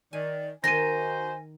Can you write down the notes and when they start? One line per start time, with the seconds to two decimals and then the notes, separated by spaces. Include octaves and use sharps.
0.13 D#3 D5 G#5
0.64 D#3 D#4 F#4 C5 G#5 C6 A#6 D#7